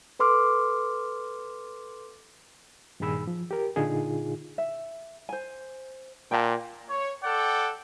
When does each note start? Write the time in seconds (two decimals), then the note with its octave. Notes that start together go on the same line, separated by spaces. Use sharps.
0.19 A4 B4 C6 D6 F6
3.00 G2 A#2 D#3 G#4 B5 E6
3.27 F3
3.51 G4 A#4
3.76 A#2 D3 D#4 F4 G#4
4.58 E5
5.29 C5 G#5
6.31 A#2 G5 A5
6.89 C#5
7.23 A4 D5 F#5 G5